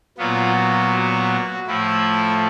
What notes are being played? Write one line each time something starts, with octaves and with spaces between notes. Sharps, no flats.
A#2 F#3 B3 F4
F#4
F#4
A2 F3 A3 E4